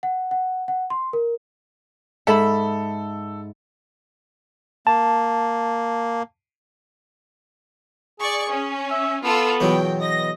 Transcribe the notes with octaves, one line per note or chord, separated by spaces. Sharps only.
F#5
F#5
F#5
C6
A#4
G#2 A4 E5 B5
A#3 A5
G#4 D5 C#6
C#4
E5
B3 F4 A4 E6
E2 B2 F#3 G5
D#5 A#6